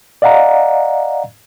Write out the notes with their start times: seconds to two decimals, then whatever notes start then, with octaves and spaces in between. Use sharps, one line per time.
0.22 D5 D#5 F5 F#5 A#5